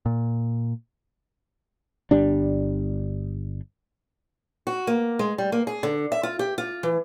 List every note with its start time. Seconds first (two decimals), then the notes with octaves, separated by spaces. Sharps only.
0.06 A#2
2.11 G1 G3 D4
4.67 F#4
4.87 A#3
5.19 G#3
5.38 G3
5.52 A#3
5.67 G#4
5.83 D3
6.12 E5
6.23 F4
6.39 G4
6.58 F4
6.83 E3